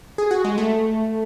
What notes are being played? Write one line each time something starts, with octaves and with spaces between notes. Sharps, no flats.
G#4
F#4
G#3
A3